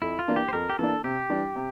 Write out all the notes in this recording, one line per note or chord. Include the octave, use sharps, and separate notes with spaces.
F2 E4
F4
E3 A#3 D4
G4
C5
F2 A#4
G4
E3 A#3 D4 A4
C3 G4
E3 G3 D4
C3